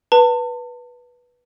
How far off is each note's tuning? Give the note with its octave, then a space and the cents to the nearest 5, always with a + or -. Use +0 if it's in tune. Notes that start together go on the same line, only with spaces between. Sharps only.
B4 -10 A5 +35